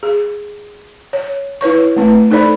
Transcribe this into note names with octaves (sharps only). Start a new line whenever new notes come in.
G#4
C#5
E4 B4 C#5 C#6
A3 C4 B4
D#4 A4 C5 D5 B5